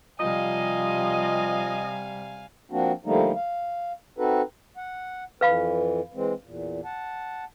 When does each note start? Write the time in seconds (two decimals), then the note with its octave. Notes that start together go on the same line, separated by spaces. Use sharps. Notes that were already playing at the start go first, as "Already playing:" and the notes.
0.20 C3 F3 G3 D#5 F5 G#5
2.71 F3 A#3 C4 D4 F#4
3.05 D3 F3 G3 A3 A#3 D#4
3.35 F5
4.18 C4 D#4 F#4 A4 B4
4.77 F#5
5.41 F2 E3 B4 F5 B5
6.14 E3 G#3 C4
6.44 E2 A#2
6.85 F#5 A5